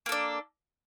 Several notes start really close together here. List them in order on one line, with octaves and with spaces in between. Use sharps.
A#3 A4 D4